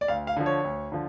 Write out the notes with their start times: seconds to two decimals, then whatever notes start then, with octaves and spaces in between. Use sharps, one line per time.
0.01 D5
0.08 D2 F5
0.27 F5
0.37 D3 F3
0.46 C#5
0.65 D2
0.92 D3 F3